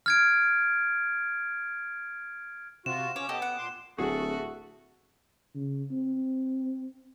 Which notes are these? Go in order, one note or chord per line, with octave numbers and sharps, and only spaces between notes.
F6 G#6 D7
C3 F4 F#4 E7
C#4 C#5 D6
B3 G4 A4 D#5
F#5
A#2 C6
D1 A3 F#4 G#4
C#3
C4